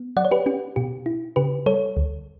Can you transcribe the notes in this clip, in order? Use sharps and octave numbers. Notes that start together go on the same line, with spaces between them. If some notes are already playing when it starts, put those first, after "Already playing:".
Already playing: B3
F#3 D5 F#5
C#5
G4 B4
C#4 G4
B2 G4
E4
C#3 G4 B4
G3 A4 C#5
D2